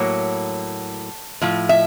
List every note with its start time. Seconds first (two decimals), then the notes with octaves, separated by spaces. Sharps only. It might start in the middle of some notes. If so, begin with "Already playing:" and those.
Already playing: A2 F#3 A#3 C#5
1.41 A2 F3
1.69 E5